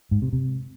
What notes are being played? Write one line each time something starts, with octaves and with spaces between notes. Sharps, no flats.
G#2
C3
C3